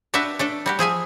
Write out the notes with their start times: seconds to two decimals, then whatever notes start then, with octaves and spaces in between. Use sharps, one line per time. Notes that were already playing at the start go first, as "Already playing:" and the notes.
0.14 D4 F#4 G4 B4 E5
0.39 A3 D4 A4
0.66 G3 F#4 G4
0.79 F3 G#4 E5 G#5